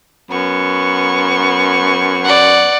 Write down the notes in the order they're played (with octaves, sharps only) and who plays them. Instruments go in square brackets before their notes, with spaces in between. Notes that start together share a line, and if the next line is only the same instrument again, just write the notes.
[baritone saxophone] F#2 [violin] B3 C#6
[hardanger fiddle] D5 F#5